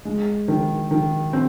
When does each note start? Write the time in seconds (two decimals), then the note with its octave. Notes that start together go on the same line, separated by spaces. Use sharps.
0.05 G#3
0.48 D#3
0.91 D#3
1.33 C4